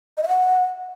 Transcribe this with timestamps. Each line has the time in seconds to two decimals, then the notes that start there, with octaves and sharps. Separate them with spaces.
0.17 D#5
0.23 E5
0.28 F#5